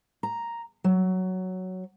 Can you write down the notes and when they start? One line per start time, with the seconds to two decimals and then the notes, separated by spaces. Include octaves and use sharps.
0.23 A#5
0.84 F#3